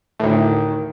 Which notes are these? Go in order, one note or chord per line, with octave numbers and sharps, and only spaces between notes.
D2 A2 D#3